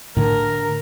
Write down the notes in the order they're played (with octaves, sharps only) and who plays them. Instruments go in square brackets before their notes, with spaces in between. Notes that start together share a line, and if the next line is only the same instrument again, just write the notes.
[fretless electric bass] A2 D3 [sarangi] A#4